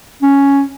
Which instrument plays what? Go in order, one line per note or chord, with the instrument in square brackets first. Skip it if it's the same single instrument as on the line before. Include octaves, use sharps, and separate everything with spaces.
[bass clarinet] C#4